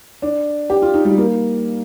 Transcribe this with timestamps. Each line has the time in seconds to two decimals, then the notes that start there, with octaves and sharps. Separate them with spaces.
0.22 D4
0.70 G4
0.82 F4
0.94 D#4
1.05 G3
1.18 A#3